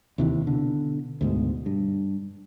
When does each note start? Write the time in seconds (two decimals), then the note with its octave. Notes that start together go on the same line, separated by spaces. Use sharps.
0.18 D#2 C3 E3
0.47 B2 D3
1.21 D2 G#2 B2
1.66 G2